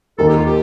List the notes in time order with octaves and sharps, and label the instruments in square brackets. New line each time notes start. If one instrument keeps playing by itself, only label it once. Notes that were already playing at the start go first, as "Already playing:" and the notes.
[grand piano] D#2 D#3 A#3 [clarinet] A4
[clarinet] G4
F4
G4